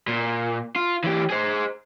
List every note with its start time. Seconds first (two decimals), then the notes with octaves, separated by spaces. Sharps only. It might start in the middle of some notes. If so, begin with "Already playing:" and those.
0.07 A#2
0.76 F4
1.04 E3 G4
1.30 G#4 C5